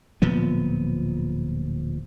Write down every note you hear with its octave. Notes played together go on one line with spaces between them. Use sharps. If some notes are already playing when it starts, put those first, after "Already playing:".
D1 A#2 F3 B3